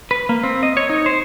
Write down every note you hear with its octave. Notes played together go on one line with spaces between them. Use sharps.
B4
A#3
C4
D#5
C#5
D#4
C5